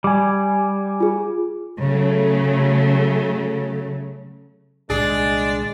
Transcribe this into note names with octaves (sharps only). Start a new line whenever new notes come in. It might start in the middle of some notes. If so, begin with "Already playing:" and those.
G3 G#5 D6
F4 G#4
C#3 F#3 A3
C2 A#2 D#3 G#3 D4 G#4